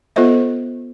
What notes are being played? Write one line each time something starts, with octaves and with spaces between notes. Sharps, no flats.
B3 F4 A4 C5 D#5 E5